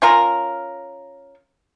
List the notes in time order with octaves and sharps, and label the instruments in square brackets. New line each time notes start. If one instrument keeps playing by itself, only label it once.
[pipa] C#4 F4 A#4